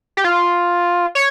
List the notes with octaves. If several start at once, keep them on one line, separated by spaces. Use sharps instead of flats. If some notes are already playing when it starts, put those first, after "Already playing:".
G4
F4
C#5